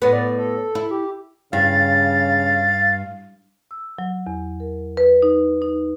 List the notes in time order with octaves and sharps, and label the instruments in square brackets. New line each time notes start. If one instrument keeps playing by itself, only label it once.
[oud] A2 B3 [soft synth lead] B4
[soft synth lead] D5
A4
[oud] E4
[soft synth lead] G4
[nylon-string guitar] G2 [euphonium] C#3 [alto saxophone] F5 [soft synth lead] A6
[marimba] E6
F#3
E2
A#4
B4
D#4
D#4